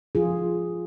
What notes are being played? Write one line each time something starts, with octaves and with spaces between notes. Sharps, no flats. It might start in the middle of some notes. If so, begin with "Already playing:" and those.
F3 F4 G#4